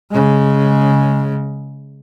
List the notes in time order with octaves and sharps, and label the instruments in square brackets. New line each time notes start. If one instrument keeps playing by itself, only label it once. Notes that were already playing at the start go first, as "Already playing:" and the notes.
[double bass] C#3 G#3